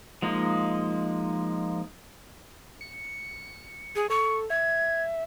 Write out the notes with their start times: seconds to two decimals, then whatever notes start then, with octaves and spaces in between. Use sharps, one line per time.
0.22 F3 G#3 A#3 D#4
2.81 C#7
3.96 G#4
4.10 A4 C#6
4.50 E5 G#6